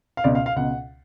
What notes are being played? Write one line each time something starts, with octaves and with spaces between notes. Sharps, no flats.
F5
C#2 B2 D5
F5
F5
C#2 B2 F#5